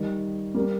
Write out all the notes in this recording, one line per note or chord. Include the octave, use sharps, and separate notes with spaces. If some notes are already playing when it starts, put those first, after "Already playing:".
Already playing: D#3 G3
G3 A#3